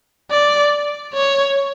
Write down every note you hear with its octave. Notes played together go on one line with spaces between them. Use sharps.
D5
C#5